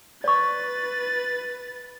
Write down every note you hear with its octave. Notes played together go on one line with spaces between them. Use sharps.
B4 D5 C#6 A6